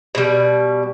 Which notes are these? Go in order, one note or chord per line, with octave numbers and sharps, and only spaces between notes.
B2 G3